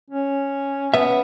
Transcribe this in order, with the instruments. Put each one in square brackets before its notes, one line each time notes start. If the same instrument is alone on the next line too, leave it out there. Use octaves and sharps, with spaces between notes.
[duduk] C#4
[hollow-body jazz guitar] B3 E5